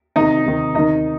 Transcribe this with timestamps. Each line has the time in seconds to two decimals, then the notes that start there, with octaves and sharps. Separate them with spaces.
0.16 C3 D#3 D#4 D#5
0.45 C3 D#3
0.75 C3 D#3 D#4 D#5